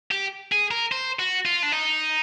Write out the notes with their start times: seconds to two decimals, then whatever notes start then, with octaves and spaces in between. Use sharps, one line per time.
0.11 G4
0.52 G#4
0.71 A#4
0.92 C5
1.19 F#4
1.45 F4
1.63 D4
1.72 D#4